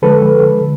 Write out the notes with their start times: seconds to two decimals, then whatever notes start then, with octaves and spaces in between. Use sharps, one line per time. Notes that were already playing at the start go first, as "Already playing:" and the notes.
0.02 D3 F3 G#3 A4 B4
0.61 D3